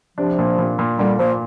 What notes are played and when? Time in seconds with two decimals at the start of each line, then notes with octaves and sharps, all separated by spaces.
0.17 C3 F3 D4
0.38 A#2
0.58 A#2
0.79 A#2
0.99 A#2 D3 G3
1.19 A#2 F3 A#3